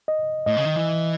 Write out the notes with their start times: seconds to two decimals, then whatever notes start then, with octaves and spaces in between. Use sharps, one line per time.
0.08 D#5
0.46 A2 D#5
0.57 C#3
0.65 D#3
0.76 E3